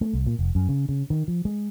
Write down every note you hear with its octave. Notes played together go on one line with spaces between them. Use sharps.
A3
C2
A#2
F1
F#2
C#3
C#3
D#3
F3
G#3